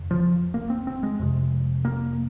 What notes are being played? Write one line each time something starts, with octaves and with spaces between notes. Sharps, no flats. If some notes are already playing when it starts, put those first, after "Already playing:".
Already playing: F2 C#3
F3
A#3
C4
C4
G#3
F2 C3
A#3